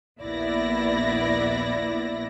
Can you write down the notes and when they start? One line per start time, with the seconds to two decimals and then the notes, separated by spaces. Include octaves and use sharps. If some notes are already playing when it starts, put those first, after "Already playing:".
0.22 A#1 D#2 B3 E4 D5 A#6